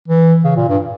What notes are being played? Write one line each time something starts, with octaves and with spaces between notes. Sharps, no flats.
E3
C#3
A#2
G2